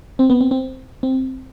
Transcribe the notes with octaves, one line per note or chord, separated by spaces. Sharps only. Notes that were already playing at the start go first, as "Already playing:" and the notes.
C4
B3
C4
C4
C4